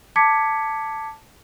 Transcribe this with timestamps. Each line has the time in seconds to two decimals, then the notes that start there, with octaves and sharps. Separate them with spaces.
0.16 A5 D6 G#6 B6 C#7